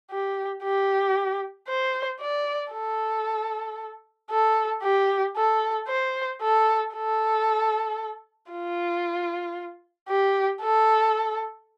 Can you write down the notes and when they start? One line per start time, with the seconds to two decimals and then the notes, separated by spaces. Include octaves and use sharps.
0.11 G4
0.63 G4
1.68 C5
2.21 D5
2.72 A4
4.31 A4
4.83 G4
5.36 A4
5.88 C5
6.41 A4
6.94 A4
8.51 F4
10.08 G4
10.61 A4